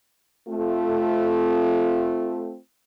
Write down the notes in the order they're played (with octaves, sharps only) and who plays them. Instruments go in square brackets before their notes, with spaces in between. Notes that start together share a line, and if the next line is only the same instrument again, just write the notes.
[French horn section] A3 C4 F4